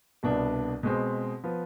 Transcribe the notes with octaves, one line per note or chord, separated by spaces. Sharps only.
C2 B2 B3 D4
B2 G#3 C4
F3 B3